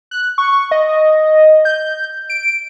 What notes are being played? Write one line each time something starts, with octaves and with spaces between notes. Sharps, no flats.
F#6
C#6
D#5
G6
D7